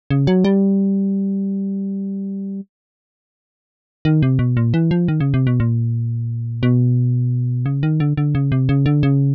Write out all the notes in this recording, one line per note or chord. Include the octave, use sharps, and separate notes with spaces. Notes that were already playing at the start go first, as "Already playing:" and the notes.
C#3
F#3
G3
D#3
C3
B2
A#2
E3
F3
D#3
C#3
C3
B2
A#2
B2
C#3
D#3
D3
D3
C#3
C3
C#3
D3
C#3